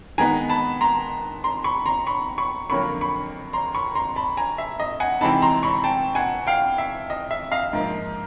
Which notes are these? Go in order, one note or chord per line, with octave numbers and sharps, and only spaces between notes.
D#3 G#3 B3 G#5 A#5
A5 B5
A#5 C6
A#5 C6
B5 C#6
A#5 C6
B5 C#6
B5 C#6
F2 D3 F#3 A#3 C#4 B5 C#6
B5 C#6
A#5 C6
B5 C#6
A#5 C6
A5 B5
G#5 A#5
E5
D#5
F#5 G#5
C3 E3 G#3 C4 D#4 A5 B5
A#5 C6
B5 C#6
G5 A5
F#5 G#5
F5 G5
E5
D#5
E5
D#5 F5
G#2 F3 A#3 D#4